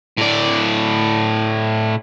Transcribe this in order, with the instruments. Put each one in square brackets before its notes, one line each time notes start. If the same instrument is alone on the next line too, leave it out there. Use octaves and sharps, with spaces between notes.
[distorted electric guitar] A2 D5